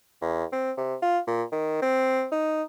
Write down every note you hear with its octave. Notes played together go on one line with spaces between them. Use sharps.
E2
C4
C3
F4
A#2
D#3
C4
D#4